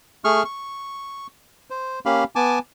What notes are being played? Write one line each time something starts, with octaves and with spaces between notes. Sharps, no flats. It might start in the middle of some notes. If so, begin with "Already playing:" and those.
A3 G#4 C#6 F6
C#6
C5
A#3 C#4 G4 F5 B5
B3 G#5 A5 D6